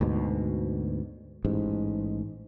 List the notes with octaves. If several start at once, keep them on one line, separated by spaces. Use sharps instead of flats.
D2 G#2 B2
A1 G#2